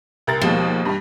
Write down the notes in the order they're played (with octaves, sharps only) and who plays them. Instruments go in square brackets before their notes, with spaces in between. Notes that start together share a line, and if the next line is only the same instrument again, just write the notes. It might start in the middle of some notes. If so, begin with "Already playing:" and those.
[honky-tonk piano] C2 A#4 A6
[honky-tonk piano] D#2 B2 G#3 [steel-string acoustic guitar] F3
[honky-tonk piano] G2 G3